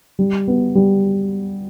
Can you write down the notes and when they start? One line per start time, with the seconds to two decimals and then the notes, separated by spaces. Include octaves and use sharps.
0.19 G3
0.48 B3
0.75 G3